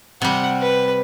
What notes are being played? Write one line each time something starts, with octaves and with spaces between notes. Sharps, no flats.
C3 G3 F#5
B4